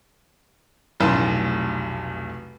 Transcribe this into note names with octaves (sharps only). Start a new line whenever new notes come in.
F1 B1 A2 A5 C6